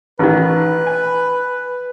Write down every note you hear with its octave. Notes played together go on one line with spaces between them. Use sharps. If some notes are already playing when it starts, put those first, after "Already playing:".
A1 D#3 B4
G#5